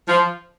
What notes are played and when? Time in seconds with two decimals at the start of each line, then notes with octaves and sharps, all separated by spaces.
0.08 F3